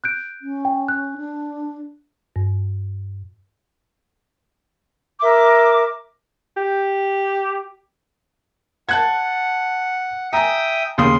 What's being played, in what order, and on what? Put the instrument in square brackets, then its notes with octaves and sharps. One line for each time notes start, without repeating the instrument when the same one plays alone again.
[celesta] F#6 G6 D7
[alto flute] C#4
[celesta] G5
F#6
[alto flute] D4
[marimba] G2
[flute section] A#4 E5 D6
[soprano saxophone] G4
[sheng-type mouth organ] F#5 [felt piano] A5 F#6 G#6
[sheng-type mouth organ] E5 G5 D#6 [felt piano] G#5 A#5
[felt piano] D#2 C#3 D#6 [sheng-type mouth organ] C6